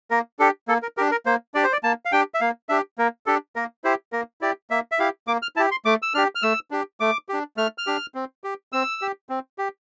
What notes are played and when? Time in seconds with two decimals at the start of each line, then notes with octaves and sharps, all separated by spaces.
0.10 A#3 A#4
0.39 D4 G4 A4
0.68 A#3 A4
0.82 A#4
0.97 D4 G4 A#4
1.11 A#4
1.26 A#3 C5
1.54 D4 G4 D5
1.64 C5
1.72 D5
1.83 A#3 A5
2.05 F5
2.12 D4 G4 G5
2.34 E5
2.41 A#3 F5
2.69 D4 G4 E5
2.98 A#3 A#4
3.26 D4 G4 A4
3.56 A#3 A#4
3.84 E4 G4 C5
4.12 A#3 A#4
4.41 E4 G4 D5
4.70 A#3 E5
4.92 E5
4.99 E4 G4 F5
5.27 A#3 D6
5.42 F6
5.56 E4 A5
5.59 G4
5.71 C6
5.85 A3 D6
6.02 E6
6.14 D4 G4 F6
6.35 F6
6.42 A3 E6
6.71 D4 G4
7.00 A3 D6
7.29 D4 G4
7.57 A3 F6
7.78 F6
7.87 D4 G4
8.15 C4
8.44 G4
8.73 C4 E6
9.02 G4
9.29 C4
9.58 G4